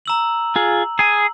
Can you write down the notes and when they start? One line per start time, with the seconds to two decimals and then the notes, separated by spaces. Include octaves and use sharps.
0.06 A#5 E6 F#7
0.56 F4 G#4
0.99 G#4 G#5